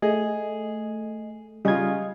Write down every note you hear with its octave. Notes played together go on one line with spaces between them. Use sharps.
A3 G#4 D#5
C#3 G3 F4 D#5 G#6